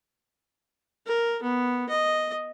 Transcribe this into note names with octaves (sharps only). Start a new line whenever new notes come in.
A#4
B3
D#5